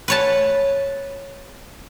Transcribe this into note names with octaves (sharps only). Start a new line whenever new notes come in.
B4 C#5 A5